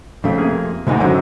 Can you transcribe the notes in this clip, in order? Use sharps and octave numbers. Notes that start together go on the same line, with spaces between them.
F2 C#3 A3
C3 A#3 G#4
D2 G#2 C3 G#3 D#4
F#2 D3 D#3 F#3